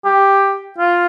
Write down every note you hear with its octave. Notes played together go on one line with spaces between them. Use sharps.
G4
F4